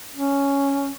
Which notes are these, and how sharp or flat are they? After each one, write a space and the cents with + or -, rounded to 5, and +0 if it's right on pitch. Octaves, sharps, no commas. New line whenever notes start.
C#4 +5